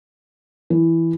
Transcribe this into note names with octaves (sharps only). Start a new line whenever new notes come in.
E3